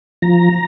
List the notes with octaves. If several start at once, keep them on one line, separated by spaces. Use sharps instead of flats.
F3 A#5